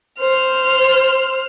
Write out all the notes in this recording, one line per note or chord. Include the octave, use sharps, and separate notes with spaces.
C5 F6